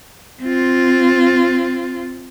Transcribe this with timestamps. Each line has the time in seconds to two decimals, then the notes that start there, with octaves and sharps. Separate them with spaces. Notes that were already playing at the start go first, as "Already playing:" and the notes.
0.42 C4 F4